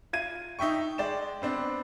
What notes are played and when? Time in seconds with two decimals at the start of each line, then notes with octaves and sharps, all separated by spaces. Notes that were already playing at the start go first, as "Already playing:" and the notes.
0.13 F4 G#6 D#7
0.59 D#4 E5 G5 C#6
0.98 G#3 D5 G5 E7
1.42 B3 C4 D4